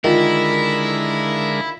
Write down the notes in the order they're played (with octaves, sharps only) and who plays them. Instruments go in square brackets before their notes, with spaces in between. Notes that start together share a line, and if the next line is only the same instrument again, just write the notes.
[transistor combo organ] D3 G#3 A#4 [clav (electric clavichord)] D#3 [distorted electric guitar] E4 [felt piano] F4